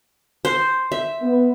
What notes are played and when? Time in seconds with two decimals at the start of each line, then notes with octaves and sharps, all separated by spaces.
0.45 C5
0.92 E5
1.21 B3